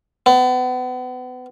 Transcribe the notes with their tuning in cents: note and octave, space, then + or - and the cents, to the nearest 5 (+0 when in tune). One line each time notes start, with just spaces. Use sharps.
B3 +35